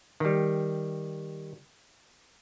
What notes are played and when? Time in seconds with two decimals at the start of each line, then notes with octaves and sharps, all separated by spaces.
0.20 D#3 G3